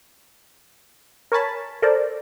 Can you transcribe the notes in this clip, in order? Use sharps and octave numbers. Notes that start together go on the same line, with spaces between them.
A#4 C#5 G#5 A5 B5
A4 A#4 C5 D5